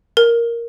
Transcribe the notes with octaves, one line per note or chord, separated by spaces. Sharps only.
A#4